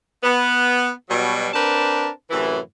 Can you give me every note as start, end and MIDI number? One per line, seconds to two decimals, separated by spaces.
0.23 0.90 59
1.10 1.49 47
1.10 1.49 54
1.10 1.49 55
1.54 2.09 60
1.54 2.09 62
1.54 2.09 70
1.54 2.09 71
1.54 2.09 81
2.30 2.59 42
2.30 2.59 45
2.30 2.59 48
2.30 2.59 52